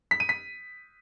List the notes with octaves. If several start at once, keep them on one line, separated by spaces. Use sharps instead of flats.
B6
D#7
B6